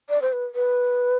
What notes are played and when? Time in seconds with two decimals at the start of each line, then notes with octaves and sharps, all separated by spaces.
0.10 D5
0.22 C5
0.33 B4
0.55 B4